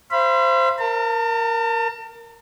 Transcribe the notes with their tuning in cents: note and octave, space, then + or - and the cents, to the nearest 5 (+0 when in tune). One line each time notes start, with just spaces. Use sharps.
C5 +0 F5 -45 B5 +0
A#4 +0 A5 +40